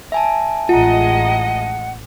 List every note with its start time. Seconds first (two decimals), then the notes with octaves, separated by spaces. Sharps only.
0.12 E5 G#5 A5
0.69 A1 G#3 F4 D#5 F#5 A#5